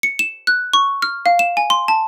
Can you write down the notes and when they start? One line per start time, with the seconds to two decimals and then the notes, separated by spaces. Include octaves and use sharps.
0.03 C#7
0.19 E7
0.47 F#6
0.73 C#6
1.02 F6
1.26 F5
1.39 E7
1.57 G#5
1.70 C6
1.88 A5